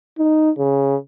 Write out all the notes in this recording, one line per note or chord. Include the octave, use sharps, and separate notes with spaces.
D#4
C#3